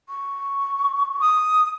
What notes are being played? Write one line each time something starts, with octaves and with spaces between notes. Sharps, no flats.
C#6
D#6